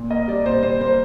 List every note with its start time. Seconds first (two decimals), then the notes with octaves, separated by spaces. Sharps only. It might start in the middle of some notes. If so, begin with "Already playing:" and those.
Already playing: A#2
0.10 A#3 D#5
0.28 G3 D5
0.45 A#2 C5
0.63 A#2 C5
0.81 A#3 C5